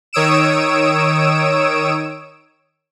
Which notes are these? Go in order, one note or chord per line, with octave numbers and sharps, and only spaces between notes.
D#3 C#5 D#6 E6 D7 E7